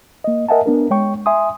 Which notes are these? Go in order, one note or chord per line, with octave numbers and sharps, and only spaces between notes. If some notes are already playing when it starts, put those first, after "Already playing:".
A#3 D#5
A#4 D#5 E5 F#5 G#5 A5
B3 D4 A#4
G#3 C#5 G5 C#6
E5 G#5 C6 D#6